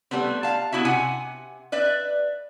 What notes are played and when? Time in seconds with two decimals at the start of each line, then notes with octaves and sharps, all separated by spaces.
0.11 G3 A3 B3 C4
0.43 F5 A5
0.72 B3 E4 F#4 E5
0.85 C3 F#5 G#5
1.72 B4 D5 E5